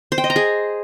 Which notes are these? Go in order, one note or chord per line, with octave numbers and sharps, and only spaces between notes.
C5
G5
D#5
A#5
G#4